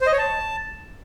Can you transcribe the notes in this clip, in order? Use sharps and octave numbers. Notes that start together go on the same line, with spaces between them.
C5
D#5
C#5
A5